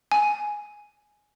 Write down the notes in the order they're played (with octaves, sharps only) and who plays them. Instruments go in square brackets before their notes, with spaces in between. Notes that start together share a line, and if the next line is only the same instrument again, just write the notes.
[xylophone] G#5